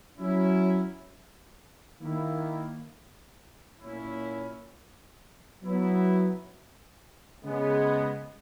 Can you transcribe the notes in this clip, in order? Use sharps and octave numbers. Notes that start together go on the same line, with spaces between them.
F#3 C#4 E4
D#3 A#3 E4
A#2 A#3 C#4 E4
F#3 B3 E4
C#3 G#3 B3